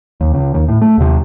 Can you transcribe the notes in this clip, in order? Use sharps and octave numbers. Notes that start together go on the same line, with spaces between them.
D#2
C#2
D#2
A2
A3
D#2 C3